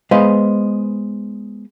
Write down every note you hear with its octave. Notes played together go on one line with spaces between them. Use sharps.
G#3 B3 B4 C5 D#5 F5